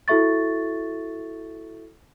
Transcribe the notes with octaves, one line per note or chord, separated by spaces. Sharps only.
E4 F#4 A4 E5 C#6 A6